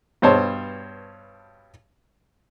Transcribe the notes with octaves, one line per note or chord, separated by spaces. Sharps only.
G2 B2 C5 C#5 A5 C6